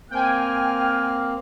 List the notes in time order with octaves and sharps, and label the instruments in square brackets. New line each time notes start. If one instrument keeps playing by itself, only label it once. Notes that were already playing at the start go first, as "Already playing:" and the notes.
[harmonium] A#3 C4 [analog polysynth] G5 G#5 [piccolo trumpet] F6